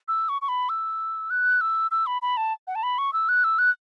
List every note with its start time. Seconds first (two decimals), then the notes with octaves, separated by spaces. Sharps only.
0.08 E6
0.29 C#6
0.42 C#6
0.49 B5
0.69 E6
1.30 F#6
1.61 E6
1.91 E6
2.06 B5
2.22 B5
2.37 A5
2.67 F#5
2.75 A5
2.83 B5
2.98 C#6
3.13 E6
3.29 F#6
3.44 E6
3.59 F#6